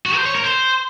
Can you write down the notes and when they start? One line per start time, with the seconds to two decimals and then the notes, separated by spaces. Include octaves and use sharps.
0.06 F#4
0.15 C5
0.26 C#5
0.35 A#4
0.44 C5